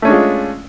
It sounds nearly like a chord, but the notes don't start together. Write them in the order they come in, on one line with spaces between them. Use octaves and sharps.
A3 C#4 D4 G#3 F4